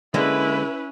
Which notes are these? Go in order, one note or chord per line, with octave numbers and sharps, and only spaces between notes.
D3 G#3 A#3 C#4 E4 B4